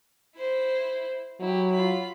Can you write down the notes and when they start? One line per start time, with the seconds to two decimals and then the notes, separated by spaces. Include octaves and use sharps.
0.36 E4 C5
1.41 F#3 E4 G4
1.72 F4 B5